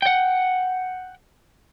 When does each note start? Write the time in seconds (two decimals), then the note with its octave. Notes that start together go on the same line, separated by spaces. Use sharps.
0.02 F#5 G5